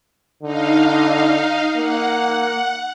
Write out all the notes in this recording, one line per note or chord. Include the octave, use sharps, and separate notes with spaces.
D3 D#4 F5
A#3 F#5